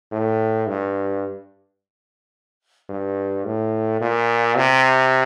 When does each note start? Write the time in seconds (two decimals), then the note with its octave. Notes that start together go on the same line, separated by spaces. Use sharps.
0.12 A2
0.67 G2
2.89 G2
3.45 A2
4.01 A#2
4.56 C3